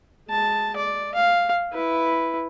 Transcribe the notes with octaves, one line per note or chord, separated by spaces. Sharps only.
G#3 A5
D5
F5
E4 B4